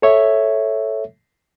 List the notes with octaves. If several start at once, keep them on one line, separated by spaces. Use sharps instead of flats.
A4 C#5 E5